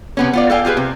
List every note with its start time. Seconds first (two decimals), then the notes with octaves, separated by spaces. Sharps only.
0.17 C3 B3 C#4
0.33 B3 F4 D5
0.50 A4 F5 G5 G#5
0.65 F4 G4 G#4 B4
0.77 C3